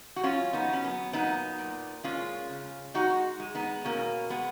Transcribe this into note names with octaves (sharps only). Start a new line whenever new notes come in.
F#4
F#3 C#4 F4
B3 D#4
F#3 C#4
B3
A#2 B3 D#4
A#2
G#3 C#4 F4
C#3
G#3 D#4 F#4
G#3
B3 D#4
B2 A#3 C#4
G#3 B3